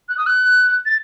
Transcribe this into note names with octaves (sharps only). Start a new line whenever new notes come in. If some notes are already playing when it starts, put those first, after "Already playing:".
F#6
D#6
F#6
A6